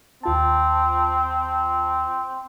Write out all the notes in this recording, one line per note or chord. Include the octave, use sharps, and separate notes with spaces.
D#2 C4 F4 A5